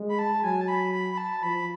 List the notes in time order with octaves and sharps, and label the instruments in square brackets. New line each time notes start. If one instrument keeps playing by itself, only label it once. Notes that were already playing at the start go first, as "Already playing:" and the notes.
Already playing: [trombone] G#3
[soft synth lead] B5
A5
[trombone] F#3 [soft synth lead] G#5
[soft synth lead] A5
B5
B5
B5
A5
[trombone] F3 [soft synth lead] B5